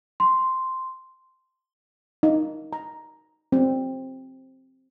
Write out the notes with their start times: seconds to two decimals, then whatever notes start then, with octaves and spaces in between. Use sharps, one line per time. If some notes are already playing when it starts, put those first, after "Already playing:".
0.20 C6
2.23 D#4
2.73 A#5
3.52 C4